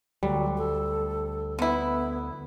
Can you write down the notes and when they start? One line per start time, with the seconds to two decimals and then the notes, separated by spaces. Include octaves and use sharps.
0.23 D2 F#3 G3
0.58 A4
1.59 D3 B3 E4